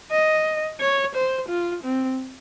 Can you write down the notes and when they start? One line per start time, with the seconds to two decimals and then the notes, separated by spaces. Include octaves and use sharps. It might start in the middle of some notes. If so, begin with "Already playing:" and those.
0.12 D#5
0.80 C#5
1.15 C5
1.49 F4
1.83 C4